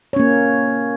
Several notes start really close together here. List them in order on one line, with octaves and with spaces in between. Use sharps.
C#5 C#4 A#3